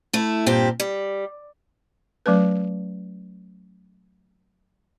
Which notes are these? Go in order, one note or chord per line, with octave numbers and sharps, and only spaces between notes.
A3 E4
G2 A#2 C4 G4
G3
F#3 A3 C#4 B4